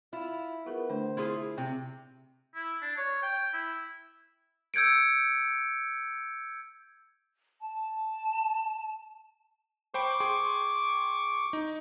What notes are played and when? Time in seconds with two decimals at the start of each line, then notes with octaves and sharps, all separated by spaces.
0.13 E4 F4
0.66 B3 F4 G#4 A#4
0.90 D3 A3 D4 C5
1.17 E4 F4 G#4
1.36 E5
1.58 C3 G5
2.55 E4
2.82 D4
2.97 C#5
3.22 G5
3.53 E4
4.74 E6 G6 G#6 C#7 D7
7.60 A5
9.94 C5 G5 B5 C#6 D6
10.20 G#4 G5 C6
11.53 D#4